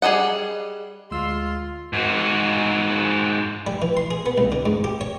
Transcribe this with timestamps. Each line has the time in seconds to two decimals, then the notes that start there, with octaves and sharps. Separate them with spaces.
0.02 G3 G#4 A4 D#5 F#5
1.11 D2 G#3 F4 C6 E6
1.93 G#2 F#4
3.67 G3
3.82 E3
3.97 C6
4.11 G#4
4.26 B3
4.38 C2
4.52 D3
4.66 G#2
4.84 G4
5.01 C#5